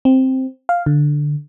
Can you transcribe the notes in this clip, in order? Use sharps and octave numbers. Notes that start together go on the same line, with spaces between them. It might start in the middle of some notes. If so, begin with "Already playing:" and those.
C4
F5
D3